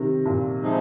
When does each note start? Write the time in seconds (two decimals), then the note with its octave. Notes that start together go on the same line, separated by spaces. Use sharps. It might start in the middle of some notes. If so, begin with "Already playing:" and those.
Already playing: C3 D#3
0.25 A#2
0.62 C3 F3 G#3 D#4